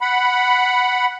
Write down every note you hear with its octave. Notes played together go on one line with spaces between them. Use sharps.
F#5 B5